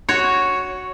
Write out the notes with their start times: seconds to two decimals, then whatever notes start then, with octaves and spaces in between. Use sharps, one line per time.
0.09 F#4 C#5